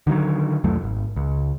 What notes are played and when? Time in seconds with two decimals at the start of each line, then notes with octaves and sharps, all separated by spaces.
0.07 D3 D#3 F3 F#3
0.64 C2 F2 F#3 A3
0.84 G#1
1.16 C#2